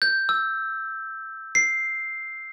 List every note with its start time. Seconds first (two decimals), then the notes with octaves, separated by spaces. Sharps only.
0.02 G6
0.29 E6
1.55 C7